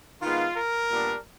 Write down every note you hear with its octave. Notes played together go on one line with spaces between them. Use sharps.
D#3 G#3 B3 F4
A#4
A#2 G3 B3 D4